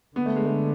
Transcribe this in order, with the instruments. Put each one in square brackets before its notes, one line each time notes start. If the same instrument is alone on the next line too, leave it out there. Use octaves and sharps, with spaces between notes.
[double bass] D3 [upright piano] B3
[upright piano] A3
G#3
A3